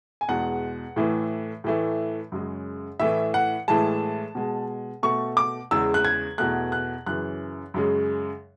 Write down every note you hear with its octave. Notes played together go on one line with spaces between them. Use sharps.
G#5
E2 B2 G#3 F#5
A2 E3 A3
A2 E3 A3
F#2 C#3 G#3
A2 E3 A3 E5
F#5
A2 E3 G#3 A5
B2 G#3
B2 A3 C#6
D6
E2 C#3 G#3 E6
F#6
G#6
E2 B2 A3 F#6
F#6
F#2 C#3 E3 F#6
F#2 C#3 G#3